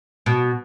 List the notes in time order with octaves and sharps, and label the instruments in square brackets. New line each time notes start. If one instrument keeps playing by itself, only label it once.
[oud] B2